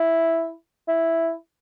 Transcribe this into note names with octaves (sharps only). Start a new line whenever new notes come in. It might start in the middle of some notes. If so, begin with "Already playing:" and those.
Already playing: E4
E4